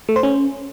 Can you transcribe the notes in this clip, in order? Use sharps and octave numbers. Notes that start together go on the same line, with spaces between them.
A3
C5
C#4